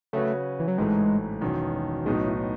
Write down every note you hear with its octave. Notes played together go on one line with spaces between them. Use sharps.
C#3 F#3 A3 C#4 F#4 B4
E3
F#3
A1 G#2 E3 G#3 A3
E1 E2 D#3 F#3 C#4
B1 A2 F#3 G#3 B3 D#4
E3